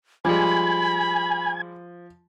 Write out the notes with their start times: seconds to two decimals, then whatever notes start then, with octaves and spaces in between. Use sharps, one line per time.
0.25 F3 G3 G#3 G#5 B5